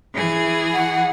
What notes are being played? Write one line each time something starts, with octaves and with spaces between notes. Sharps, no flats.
E3 G#4
F#5